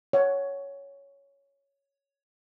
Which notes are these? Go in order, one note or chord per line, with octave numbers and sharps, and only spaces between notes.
C#5 F#5